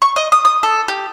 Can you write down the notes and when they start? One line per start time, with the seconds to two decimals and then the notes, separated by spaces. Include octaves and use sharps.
0.02 C#6
0.16 D#5
0.32 D#6
0.45 D#6
0.63 A4
0.88 G4